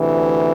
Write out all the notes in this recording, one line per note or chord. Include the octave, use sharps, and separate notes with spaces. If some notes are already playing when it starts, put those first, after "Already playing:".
Already playing: D2 C3 E3